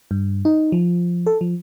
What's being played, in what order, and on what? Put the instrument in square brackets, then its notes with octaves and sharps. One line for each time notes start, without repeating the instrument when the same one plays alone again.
[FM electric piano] G2
D#4
F3
A4
F3